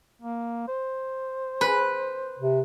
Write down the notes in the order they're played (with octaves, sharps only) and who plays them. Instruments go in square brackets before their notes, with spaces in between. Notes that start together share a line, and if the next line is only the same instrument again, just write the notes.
[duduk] A#3
C5
[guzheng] B4
[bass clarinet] C3